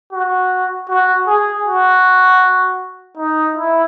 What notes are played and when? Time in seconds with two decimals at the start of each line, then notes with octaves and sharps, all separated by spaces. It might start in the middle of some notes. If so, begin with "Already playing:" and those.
0.13 F#4
0.89 F#4
1.27 G#4
1.66 F#4
3.17 D#4
3.56 E4